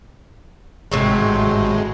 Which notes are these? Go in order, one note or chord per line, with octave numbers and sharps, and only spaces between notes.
G#1 A2 C3 F#3 G#3